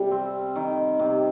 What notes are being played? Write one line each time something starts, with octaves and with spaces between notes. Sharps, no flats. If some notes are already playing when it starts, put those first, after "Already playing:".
Already playing: C3 G3
C4
D#3
C3